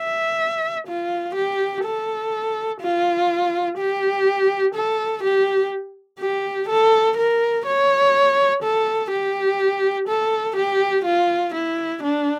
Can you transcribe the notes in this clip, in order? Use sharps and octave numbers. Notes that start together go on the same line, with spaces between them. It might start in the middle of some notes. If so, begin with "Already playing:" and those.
Already playing: E5
F4
G4
A4
F4
G4
A4
G4
G4
A4
A#4
C#5
A4
G4
A4
G4
F4
E4
D4